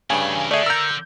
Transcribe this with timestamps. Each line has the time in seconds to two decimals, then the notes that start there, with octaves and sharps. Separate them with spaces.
0.10 G2 C#3 A3 D4 G#5
0.34 E3 A#4
0.51 D3 A3 G#4 D5 E5
0.66 A#4 A#5 E6 G6